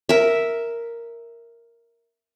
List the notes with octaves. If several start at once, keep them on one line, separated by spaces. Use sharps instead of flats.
A#4 E5